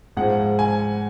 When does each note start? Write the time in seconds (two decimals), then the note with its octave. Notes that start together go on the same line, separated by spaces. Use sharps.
0.17 G#2 F3 G#3 F#5
0.59 G#5